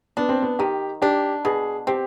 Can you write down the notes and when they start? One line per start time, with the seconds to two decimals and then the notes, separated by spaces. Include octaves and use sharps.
0.17 B3 D4
0.29 C4
0.43 B3
0.59 D#3 G4
1.02 D4 G4
1.45 B2 G#4
1.87 C4 G4